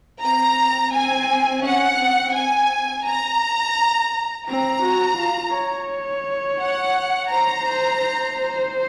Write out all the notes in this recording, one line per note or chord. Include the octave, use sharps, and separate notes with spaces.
C4 A#5
C4 G#5
C#4 F#5
C4
C4 G#5
A#5
C4 A#5
F#4
F4
C#5
F#5
C5 A#5
C5
C5